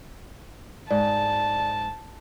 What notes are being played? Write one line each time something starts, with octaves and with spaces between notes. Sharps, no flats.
G#2 D5 A5